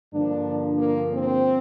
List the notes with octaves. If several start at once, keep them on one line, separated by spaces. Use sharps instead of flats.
G2 D3 F3 A#3 D4
A#3
C4